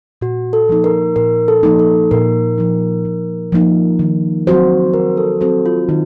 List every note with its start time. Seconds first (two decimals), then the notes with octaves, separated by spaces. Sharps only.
0.21 A#2 F#4
0.53 A4
0.69 F3 A#3 D#4
0.84 A#4
1.16 A#2 A#4
1.48 A4
1.63 F3 A#3 D#4
1.79 A4
2.11 A#2 A#4
2.58 F3 A#3 D#4
3.05 A#2
3.52 F3 A#3 D#4
3.99 D#3
4.47 F#3 C4 F#4 C5
4.94 D#3 A#4
5.17 A4
5.41 F#3 C4 F#4 A4 C5
5.66 F4
5.89 D#3 D#4